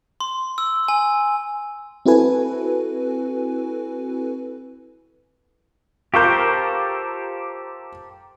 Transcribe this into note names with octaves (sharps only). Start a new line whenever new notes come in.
C6
E6
G#5
C4 E4 F#4 A4 B4 G#5
F4 G4 A4 A#4 C5 C#6 D6 G6